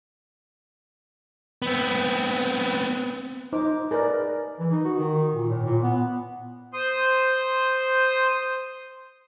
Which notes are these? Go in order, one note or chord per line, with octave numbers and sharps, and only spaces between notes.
B3 C4
D#4 C5 D6
G#4 A#4 B4 D5
E3
D#4
F#4
D#3
A#2
A2
A#2
B3
C5 C6 D#6